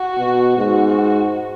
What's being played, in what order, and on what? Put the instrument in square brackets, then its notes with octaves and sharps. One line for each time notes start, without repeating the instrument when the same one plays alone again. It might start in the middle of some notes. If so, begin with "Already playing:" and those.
Already playing: [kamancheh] F#4
[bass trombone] B2
[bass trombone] G#2 [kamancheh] F#4